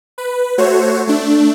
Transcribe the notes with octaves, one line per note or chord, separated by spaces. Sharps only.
B4
A3 F#4 C5 C#5
A3 D4